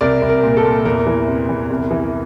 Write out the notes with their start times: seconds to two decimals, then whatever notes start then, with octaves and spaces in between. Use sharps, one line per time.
0.01 C2 A#4 D5
0.22 C2
0.29 A#4
0.43 A#2
0.57 A4
0.64 A#2
0.85 E2 A#4
1.07 E3
1.28 C3
1.49 E2
1.70 C2
1.91 E3